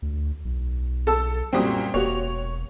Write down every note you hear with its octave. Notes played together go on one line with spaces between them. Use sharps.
D2
B1
A4 A5 E6
F#2 A#2 F#3 G3 C4 D#6
E1 A#3 F#4 G4 C#5